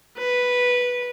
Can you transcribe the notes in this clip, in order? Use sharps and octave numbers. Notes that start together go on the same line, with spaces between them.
B4